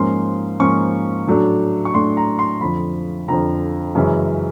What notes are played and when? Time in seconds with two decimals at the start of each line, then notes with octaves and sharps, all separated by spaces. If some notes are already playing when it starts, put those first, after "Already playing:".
Already playing: G#2 F3 A#3 C#4 C6
0.60 G#2 F3 A#3 C#4 C#6
1.27 A2 F#3 A3 D4
1.85 C#6
1.94 A2 F#3 A3 D4 C6
2.17 A#5
2.39 C6
2.61 F2 D3 F3 B5
3.28 F2 D3 F3 A#5
3.95 F#2 C#3 E3 G#3 C#4